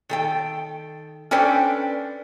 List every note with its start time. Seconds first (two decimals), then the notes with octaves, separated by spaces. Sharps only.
0.09 D#3 A4 G5
1.31 C#4 D4 A4 B4 C5 G5